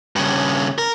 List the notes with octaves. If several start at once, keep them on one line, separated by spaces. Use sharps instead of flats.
G2 C#3
A#4